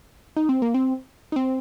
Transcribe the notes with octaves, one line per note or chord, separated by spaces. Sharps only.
D#4
C4
A#3
C4
D#4
C4